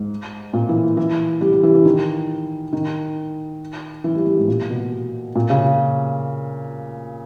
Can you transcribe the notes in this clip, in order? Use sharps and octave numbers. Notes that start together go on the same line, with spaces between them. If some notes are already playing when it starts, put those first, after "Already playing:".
Already playing: G#2
A#2
E3
E3
G3
G3
E3
E3
D#3
D#3
E3
G3
G3
G#2
A#2
B2
A#2
C#3